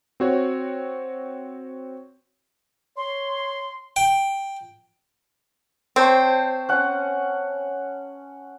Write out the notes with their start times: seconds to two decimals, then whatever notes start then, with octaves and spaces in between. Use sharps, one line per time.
0.20 C4 F#4 C#5
2.97 C#5 C6
3.96 G5
5.96 C4 C5 C#5 A5
6.69 C#4 F#5